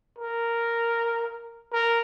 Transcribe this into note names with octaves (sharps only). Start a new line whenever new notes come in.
A#4
A#4